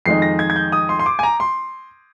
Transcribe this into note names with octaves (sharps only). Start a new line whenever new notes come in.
F2 D#3 G#3 D#4 C7
A#6
G#6
G#6
G6
D#6
C6
C6
D6
G#5
A#5
C6